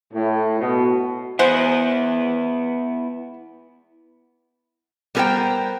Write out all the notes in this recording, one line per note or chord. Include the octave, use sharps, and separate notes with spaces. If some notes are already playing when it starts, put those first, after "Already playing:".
A2
B2
G#3 B3 E4 C5 F#5
G3 B3 G#4 A#4 C5 G5